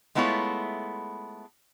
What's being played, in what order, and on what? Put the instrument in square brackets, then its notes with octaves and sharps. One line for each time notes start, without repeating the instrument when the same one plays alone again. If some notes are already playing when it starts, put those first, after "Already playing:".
[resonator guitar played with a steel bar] G#3 A3 B3 E4 F4 C#5